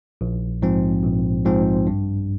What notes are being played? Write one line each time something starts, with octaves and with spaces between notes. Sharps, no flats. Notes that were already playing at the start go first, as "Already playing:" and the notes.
A#1
G#2 F3 C4
A#1
G#2 F3 C4
G2